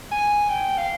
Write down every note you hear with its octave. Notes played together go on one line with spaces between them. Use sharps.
G#5
G5
F5